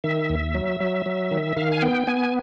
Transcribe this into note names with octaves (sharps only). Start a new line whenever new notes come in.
D#3 E5
D#2
F#3
F#3
F#3
D#3
D#3 F5
G#5
B3 G5
B3 G#5